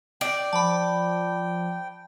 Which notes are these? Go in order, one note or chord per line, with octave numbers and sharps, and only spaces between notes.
D5 G5
F3 A5 B5